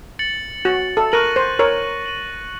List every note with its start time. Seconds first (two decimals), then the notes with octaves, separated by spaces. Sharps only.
0.19 A6 C#7 F#7
0.65 F#4
0.97 A4
1.12 A#4 C#6 F#6 A#6 D#7 F#7
1.36 C5
1.59 A#4 C#5
2.06 D#7 F#7